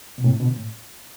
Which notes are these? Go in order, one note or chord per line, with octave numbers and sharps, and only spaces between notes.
B2
A2 C3
B2 D3
A2